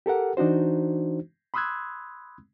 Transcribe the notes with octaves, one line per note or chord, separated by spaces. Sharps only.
G4 A4 A#4 F#5
E3 D4 D#4 F#4 C5
B5 C6 D#6 E6 F#6 G#6